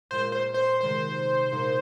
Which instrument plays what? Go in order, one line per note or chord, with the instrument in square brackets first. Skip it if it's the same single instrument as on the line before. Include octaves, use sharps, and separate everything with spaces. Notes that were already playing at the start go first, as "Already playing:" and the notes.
[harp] A#2 G#3 F4 [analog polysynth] C5
[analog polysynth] C5
C5
[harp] C3 D#3 G#3 C4 [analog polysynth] C5
[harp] A#2 G#3 D#4 G#4